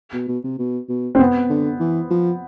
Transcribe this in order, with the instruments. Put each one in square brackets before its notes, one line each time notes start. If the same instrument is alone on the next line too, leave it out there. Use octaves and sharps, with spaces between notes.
[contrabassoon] B2
B2
C3
B2
B2
[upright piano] C4
B3
[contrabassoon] D3
E3
F3